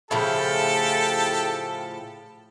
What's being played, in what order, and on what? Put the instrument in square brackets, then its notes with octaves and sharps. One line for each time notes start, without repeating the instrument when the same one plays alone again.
[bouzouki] A2 C#3 F3 [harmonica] G4 A4 A5